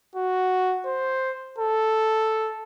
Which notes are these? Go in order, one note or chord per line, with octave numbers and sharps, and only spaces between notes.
F#4
C5
A4